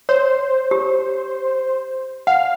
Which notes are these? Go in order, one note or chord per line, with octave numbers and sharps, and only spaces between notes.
C5 C#5
G4
F5 F#5